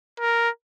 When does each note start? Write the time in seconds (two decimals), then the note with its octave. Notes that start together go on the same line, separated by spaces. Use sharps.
0.20 A#4